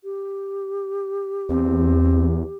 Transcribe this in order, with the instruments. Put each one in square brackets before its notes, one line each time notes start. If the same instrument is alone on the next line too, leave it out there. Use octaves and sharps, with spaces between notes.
[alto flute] G4
[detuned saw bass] E2 [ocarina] C4